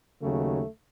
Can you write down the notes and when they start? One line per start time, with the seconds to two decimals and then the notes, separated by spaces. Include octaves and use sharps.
0.20 D#2 C#3 F#3 A3